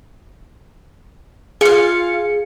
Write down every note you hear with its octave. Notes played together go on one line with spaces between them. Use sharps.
F4 G#4 F5 C#7